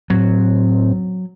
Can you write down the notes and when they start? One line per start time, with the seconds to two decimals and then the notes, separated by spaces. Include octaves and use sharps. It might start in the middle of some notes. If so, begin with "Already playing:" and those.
0.10 A2 F#3 C4